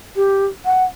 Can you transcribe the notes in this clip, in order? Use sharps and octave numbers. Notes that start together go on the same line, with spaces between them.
G4
F#5